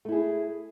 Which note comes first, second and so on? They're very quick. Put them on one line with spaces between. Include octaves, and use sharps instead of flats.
A3 E4 G#4